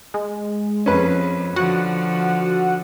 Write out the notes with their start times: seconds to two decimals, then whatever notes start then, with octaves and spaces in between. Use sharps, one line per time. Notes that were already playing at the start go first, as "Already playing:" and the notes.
0.14 G#3
0.86 F2 C#4 B4
1.56 D3 F3 F#4 F#5